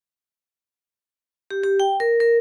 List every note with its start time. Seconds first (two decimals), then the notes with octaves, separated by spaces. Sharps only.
1.51 G4
1.64 G4
1.80 G5
2.00 A#4
2.20 A#4